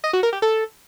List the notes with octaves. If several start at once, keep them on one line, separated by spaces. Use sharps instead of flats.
D#5
F#4
A#4
G4
A4